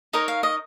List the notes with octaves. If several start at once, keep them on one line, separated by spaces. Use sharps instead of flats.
D#4 A#4 C#5 D#5
F5
D#5